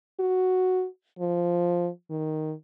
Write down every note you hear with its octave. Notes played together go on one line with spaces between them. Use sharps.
F#4
F3
D#3